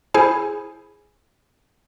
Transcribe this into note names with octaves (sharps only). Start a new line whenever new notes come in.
E4 G#4 C5 G#5